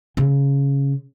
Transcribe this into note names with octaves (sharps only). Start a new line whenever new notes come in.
C#3